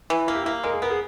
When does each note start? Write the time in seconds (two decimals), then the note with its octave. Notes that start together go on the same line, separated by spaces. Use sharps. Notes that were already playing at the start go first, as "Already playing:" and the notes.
0.10 E3
0.27 A#3 E4
0.35 G4
0.43 E4
0.46 A#3
0.64 G#3 A#4
0.73 G#4
0.82 B3 A#4
0.90 G#4